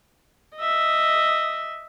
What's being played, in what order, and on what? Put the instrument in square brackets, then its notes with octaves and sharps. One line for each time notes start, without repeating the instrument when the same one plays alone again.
[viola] D#5 E5